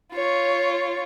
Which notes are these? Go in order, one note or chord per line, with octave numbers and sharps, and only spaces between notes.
F4 C#5